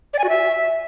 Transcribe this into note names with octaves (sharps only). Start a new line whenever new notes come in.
D5
G#5
F#4
E5